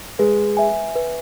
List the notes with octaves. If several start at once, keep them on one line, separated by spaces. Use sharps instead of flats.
G#3 B4
E5 G#5
B4